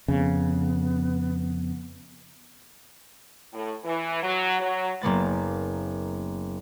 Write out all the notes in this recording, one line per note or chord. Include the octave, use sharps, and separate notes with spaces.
F2 C#3 B3
A2
E3
F#3
F#3
F#1 A#3 B3 A6